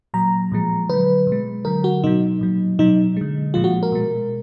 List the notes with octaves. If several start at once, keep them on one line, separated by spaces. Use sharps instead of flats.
A#2 F#3 A#5
A#2 F3 G#3
D3 F#3 B4
B2
G#3
D3 F#3 A#4
F#4
B2 F#3 D#4
A#2 F#3
B2 F#3 D#4
D3 G#3
A#2 F3 G#3 F4
F#4
A#4
B2 G#3